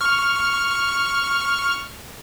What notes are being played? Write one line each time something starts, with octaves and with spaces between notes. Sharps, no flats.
C#6 F6